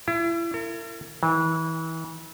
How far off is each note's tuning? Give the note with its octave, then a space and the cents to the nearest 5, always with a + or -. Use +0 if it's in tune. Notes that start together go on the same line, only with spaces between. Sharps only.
E4 +35
A#4 -45
E3 -30